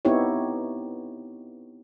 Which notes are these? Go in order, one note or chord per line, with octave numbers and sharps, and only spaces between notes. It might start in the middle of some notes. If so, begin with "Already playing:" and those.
B3 C4 D#4 E4 G4 C#5